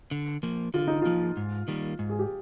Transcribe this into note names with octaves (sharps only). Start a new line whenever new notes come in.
D3
F3 A#3
D3 F4
D#4
F3 A#3 F4
G#2
D#3 G3 A#3
G#2
G#4
G4